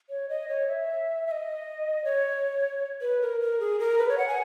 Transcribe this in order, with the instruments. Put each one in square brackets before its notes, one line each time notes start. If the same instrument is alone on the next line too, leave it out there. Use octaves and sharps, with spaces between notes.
[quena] C#5
D#5
C#5
E5
E5
D#5
C#5
B4
A#4
A#4
G#4
A#4
B4
C#5
F#5
G#5